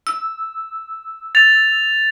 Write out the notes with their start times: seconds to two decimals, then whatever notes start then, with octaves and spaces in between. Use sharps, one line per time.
0.07 E6
1.35 A6 F7